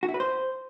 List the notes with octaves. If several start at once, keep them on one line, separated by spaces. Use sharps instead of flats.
F#4
E4
B4
C5